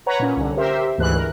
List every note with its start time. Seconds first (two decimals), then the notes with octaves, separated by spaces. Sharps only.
0.06 B4 C#5 F#5 A#5
0.19 A#2 C#4
0.36 C2 D3
0.57 G4 A#4 C5 E5
0.98 D2 G#2 E3 F#6
1.15 A#4